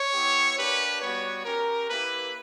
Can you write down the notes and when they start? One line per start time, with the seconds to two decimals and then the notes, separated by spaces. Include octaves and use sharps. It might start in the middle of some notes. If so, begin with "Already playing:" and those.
Already playing: C#5
0.13 B3 E4 G4
0.57 A#3 D4 G4 B4
1.01 G3 B3 F#4 C#5
1.45 C#4 G4 A#4
1.89 A#3 E4 G4 B4